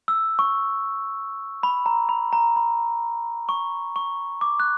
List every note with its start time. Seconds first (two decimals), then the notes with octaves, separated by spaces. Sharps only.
0.08 E6
0.39 C#6
1.63 B5
1.86 A#5
2.09 B5
2.33 A#5
2.56 B5
3.49 C#6
3.96 C#6
4.41 D6
4.60 F#6